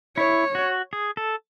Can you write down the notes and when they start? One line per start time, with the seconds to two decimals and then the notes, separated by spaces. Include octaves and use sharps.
0.17 E4 C#5
0.55 F#4
0.93 G#4
1.17 A4